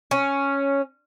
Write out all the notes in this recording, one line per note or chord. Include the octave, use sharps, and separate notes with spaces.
C#4